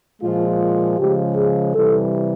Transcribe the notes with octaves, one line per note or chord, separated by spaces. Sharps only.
A#2 F3 G#3 F4
C#3 F3 G#3 G4
G#4
C3 E3 G3 A4